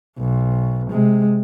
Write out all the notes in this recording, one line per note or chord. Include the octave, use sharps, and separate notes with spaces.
B1
C3 G#3